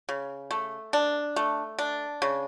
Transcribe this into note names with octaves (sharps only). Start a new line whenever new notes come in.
C#3
A3
D4
A3
D4
C#3